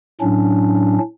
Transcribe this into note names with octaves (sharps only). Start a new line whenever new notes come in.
A2 F#3 C#4 D4